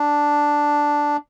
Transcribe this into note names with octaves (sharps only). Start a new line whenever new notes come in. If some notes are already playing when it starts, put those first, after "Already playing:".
Already playing: D4